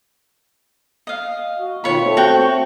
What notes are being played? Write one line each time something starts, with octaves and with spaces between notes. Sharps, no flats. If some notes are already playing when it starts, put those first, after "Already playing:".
D#5 F5
F#4
B2 D#3 F4 C#5 B5
A3 C4
F#4 C#5 G5